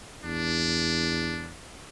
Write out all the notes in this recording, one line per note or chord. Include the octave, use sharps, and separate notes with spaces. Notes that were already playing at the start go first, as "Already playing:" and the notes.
E2 D4